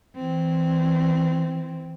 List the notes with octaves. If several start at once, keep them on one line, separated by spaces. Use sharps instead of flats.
E3 C4